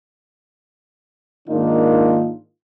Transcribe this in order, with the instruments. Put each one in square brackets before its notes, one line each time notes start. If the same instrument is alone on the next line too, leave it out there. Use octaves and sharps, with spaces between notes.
[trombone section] G#2 D#3 A#3 D4 D#4 F4